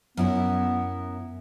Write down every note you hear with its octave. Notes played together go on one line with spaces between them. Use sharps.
F#2 B3 E4 A#4